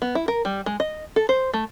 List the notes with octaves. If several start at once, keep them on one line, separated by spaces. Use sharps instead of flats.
B3
E4
A#4
G3
G#3
D#5
A4
C5
A3